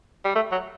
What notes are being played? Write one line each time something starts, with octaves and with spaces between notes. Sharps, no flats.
G3
A3
F#3